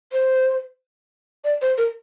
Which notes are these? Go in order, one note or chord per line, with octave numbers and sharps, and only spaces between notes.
C5
D5
C5
A#4